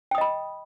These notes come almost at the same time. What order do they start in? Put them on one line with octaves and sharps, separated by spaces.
G5 D#6 D#5 B5